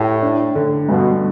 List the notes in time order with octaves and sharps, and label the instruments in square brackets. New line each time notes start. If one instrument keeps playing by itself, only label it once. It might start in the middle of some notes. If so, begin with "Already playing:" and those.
Already playing: [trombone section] A2 [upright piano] G4
[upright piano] D4
D3
[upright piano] G2 [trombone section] B2